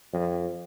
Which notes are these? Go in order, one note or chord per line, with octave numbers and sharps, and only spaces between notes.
F2